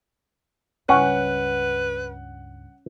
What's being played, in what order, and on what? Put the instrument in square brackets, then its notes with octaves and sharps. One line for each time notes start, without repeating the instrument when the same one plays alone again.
[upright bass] C#2 G2 [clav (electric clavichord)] C#4 [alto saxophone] B4 [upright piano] F#5